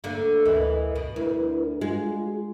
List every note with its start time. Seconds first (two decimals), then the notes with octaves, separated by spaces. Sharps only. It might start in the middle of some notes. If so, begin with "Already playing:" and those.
0.04 D2 D3 A#3
0.46 D2 E3 A#4 D#5
0.96 B2
1.16 D2 E4 A#4 B4
1.81 G#3 F4 F#4 G#4